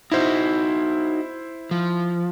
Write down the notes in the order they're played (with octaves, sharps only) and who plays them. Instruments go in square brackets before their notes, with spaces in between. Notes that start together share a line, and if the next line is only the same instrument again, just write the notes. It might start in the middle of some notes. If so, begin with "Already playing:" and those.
[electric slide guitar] D#4 F#4 [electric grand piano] E4 C5
[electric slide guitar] F3